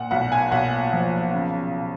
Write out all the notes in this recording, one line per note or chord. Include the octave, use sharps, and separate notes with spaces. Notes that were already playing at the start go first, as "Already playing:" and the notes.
Already playing: A#2 F#5
B1 F#5
G#5
B1 F#5
F3
C#3